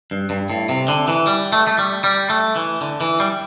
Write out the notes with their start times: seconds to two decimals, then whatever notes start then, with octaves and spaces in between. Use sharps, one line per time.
0.11 G2
0.30 G2
0.50 A2
0.69 C3
0.88 D3
1.08 E3
1.27 G3
1.53 A3
1.67 A3
1.78 G3
2.04 G3
2.30 A3
2.56 E3
2.81 D3
3.01 E3
3.20 G3